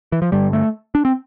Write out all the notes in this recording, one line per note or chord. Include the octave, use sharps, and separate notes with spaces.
E3
F3
G2 D3 G3
A3
D4
C4